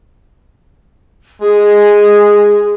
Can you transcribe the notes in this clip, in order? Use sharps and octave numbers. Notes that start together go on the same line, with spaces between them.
G#3 G#4